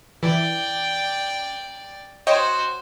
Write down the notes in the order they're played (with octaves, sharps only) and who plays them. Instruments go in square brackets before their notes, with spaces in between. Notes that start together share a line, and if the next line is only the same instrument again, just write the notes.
[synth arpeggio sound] E3 [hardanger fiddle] D5 G5
[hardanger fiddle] F#4 C5 [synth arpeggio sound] C#5 D#5 G5